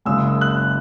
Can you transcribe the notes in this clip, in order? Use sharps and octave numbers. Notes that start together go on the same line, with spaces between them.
F#1 F#2 C#3 G#3 E6
F#6